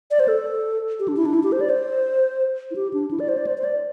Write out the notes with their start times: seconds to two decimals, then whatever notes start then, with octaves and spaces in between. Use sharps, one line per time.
0.11 D5
0.20 C5
0.28 A4
0.99 G4
1.08 D4
1.17 E4
1.26 D4
1.34 E4
1.43 G4
1.52 C5
1.61 D5
1.70 C5
2.71 E4
2.76 G4
2.93 D4
3.11 E4
3.20 D5
3.28 C5
3.38 D5
3.47 C5
3.58 C5
3.64 D5